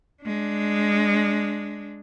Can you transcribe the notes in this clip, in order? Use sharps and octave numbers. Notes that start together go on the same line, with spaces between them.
G#3 D4